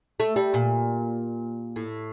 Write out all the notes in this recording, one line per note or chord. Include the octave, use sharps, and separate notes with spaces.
A3
G3
A#2
A2